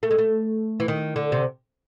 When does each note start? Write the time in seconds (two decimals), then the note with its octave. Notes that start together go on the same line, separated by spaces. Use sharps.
0.03 A3
0.11 G#3
0.18 A3
0.80 E3
0.88 D#3
1.16 D3
1.32 C3